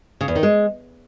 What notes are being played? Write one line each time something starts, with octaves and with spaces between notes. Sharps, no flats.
C#3
E2
D#3
G#3